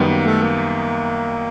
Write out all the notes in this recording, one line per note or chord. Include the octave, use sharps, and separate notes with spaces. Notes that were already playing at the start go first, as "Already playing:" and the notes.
Already playing: F#2 D#3 G3 B3
A#3
A3
A#3